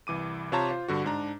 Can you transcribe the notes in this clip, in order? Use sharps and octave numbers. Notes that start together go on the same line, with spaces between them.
C2 E3 D6 D#7
C3 F4 C5 C#5 A5 A#5
F4 C5
G2 D3 F#4
G#2 D4 A#5